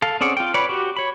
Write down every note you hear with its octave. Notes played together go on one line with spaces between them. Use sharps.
A4 F5
C4 C#4 G#4 D5 F#5
F4 G5
B4 C#5 D5 B5
F#4 G4
C#5 B5